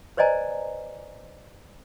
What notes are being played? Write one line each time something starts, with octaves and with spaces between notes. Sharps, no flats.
B4 C5 D5 D#5 G#5 A#5